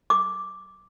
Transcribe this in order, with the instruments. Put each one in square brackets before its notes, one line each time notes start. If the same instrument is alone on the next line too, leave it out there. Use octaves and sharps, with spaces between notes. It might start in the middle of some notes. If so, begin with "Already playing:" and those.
[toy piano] D6